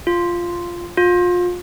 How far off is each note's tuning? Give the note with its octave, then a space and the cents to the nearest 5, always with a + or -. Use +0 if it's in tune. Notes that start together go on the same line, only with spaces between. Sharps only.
F4 -5
F4 +30